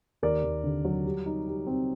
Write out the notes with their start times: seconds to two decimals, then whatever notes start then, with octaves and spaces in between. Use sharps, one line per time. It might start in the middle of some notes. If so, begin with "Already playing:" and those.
0.22 D#2 A#4 D5
0.43 D#2
0.64 D3
0.85 F#3
1.05 G3
1.26 D#4
1.47 G3
1.67 C4